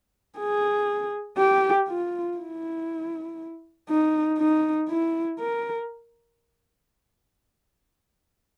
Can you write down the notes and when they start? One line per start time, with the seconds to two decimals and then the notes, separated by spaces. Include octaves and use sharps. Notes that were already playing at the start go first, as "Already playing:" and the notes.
0.38 G#4
1.38 G4
1.88 F4
2.38 E4
3.89 D#4
4.38 D#4
4.89 E4
5.39 A#4